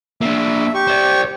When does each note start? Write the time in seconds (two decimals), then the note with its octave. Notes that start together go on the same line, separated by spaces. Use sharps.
0.21 A#3 D4 E5
0.74 G4 C#6
0.87 C5 D5